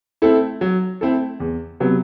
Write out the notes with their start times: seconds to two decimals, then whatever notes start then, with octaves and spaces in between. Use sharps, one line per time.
0.22 A3 C4 E4 A4
0.61 F#3
1.01 A3 C4 E4 A4
1.40 E2
1.80 C3 F#3 B3